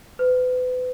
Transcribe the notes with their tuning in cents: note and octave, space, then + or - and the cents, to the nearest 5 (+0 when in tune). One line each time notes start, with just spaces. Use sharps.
B4 +35